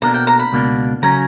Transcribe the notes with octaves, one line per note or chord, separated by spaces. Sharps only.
B2 A#3 D4 A#5
G5
A#5
B5
C#2 B2 A#3 D4
C#3 F#3 C#4 A#5